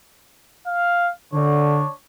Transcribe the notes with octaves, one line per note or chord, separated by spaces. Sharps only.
F5
D3 D4 C#5